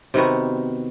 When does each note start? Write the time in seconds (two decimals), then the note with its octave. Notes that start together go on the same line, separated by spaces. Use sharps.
0.14 C3 D#3 B3 F#4